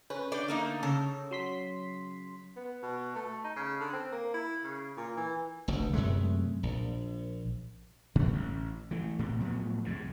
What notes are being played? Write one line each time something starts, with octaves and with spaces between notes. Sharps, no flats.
C#4 B4
D3 D5 G6
A3 A#3 D#4
C#3 A4
F#3 C6 B6
B3
B2
A3
D#4
C#3
D3
C4
A#3
E4
C#3
A#2
E3
F1 D2
F#2 C3 G#3 A3
A#1
G#2 D3 G3
A1
E3 A3
A2 C3
A2 F3 F#3 B3
C2 F2 G#2 C3